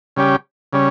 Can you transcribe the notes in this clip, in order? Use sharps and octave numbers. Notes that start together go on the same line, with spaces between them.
C#3 G3 C#4 G4
C#3 G3 C#4